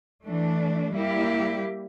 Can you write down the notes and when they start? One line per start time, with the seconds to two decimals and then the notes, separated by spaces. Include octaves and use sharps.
0.25 E3 A3 D4
0.92 G3 A#3 E4 G4